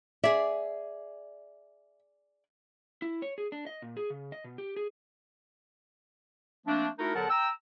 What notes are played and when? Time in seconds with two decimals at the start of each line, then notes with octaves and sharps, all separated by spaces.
0.24 G#4 D5 E5
3.02 E4
3.22 C#5
3.38 G#4
3.52 D4
3.67 D#5
3.82 A#2
3.97 G#4
4.10 C#3
4.32 D#5
4.44 B2
4.58 G4
4.76 G#4
6.66 F3 A3 A#3 C4 D4
6.98 A3 D#4 E4 F#4 A#4
7.15 E2 D3 F#3 A#4 F#5 A5
7.30 G5 A#5 E6